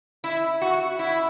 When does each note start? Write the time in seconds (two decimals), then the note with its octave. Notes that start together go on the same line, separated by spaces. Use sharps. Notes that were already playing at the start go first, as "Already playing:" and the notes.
0.24 E4
0.62 F#4
0.99 E4